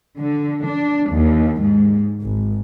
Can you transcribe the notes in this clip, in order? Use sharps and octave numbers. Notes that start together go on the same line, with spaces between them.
D3
D4
D#2
G#2
G#1